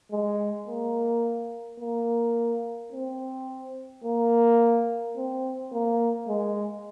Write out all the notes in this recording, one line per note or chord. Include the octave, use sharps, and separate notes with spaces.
G#3
A#3
A#3
C4
A#3
C4
A#3
G#3